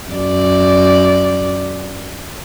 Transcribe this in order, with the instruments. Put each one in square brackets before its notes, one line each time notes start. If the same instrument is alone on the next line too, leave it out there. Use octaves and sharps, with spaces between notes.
[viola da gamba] F#2 D5